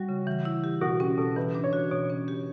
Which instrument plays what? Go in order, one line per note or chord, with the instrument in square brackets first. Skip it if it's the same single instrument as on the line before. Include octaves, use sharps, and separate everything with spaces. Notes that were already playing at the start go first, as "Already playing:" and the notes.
Already playing: [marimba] G3 [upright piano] F#4
[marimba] C#3
E3
E4
G4
[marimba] B2 [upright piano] F#4
[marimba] C#4 [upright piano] G4
[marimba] B2 [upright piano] A4
[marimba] E3 [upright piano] B4
[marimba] D4
[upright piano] C#5
[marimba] F#4
[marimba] B2 [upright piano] C#5
[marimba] C#4
G4